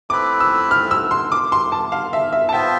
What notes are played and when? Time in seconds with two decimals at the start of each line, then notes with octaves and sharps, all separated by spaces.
0.10 A3 C4 E4 B4 D6
0.40 E6
0.71 F6
0.91 E6
1.11 C6
1.32 D6
1.52 C6
1.72 A5
1.92 F5
2.13 E5
2.33 E5
2.49 A5
2.53 B3 F4 C5 E5 G5